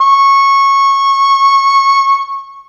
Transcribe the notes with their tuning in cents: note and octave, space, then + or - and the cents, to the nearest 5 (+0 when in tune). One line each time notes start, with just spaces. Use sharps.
C#6 -15